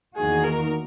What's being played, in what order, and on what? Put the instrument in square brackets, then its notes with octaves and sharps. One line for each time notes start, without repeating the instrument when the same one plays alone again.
[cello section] E2 D#3 A#3 D#4 F#4 [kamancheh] G#4
[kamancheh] A#4